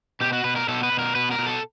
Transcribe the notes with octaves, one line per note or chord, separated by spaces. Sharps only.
B2 G4
F#4
B2 B4
A#4
B2 A4
B4
B2
A#4
B2 B4
A#4
B2
A4